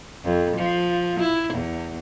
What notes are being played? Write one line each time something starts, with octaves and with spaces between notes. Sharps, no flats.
F2
F3
E4
E2